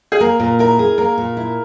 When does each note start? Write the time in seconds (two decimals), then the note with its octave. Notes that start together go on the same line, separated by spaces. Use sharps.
0.12 G#4
0.20 A#3 A#4
0.40 A#2 A#4
0.59 E4 A#4
0.79 G#4
0.98 A#3 A#4
1.18 A#2
1.37 E4